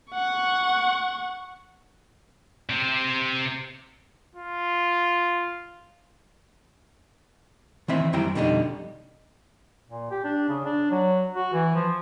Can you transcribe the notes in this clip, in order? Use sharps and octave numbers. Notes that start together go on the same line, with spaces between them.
F#5 C#6
C3 C4
F4
D#3 E3 C4 E5
F#2 G3 E4 G5 A#5
F2 B2 D3 G3 C#4 D#4
A#2
G4
D4
C#3
D4
F#3
F#4
E3
F3